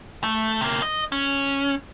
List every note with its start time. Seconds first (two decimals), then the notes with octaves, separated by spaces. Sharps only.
0.24 A3
0.61 C3 A#3
0.82 D#5
1.12 C#4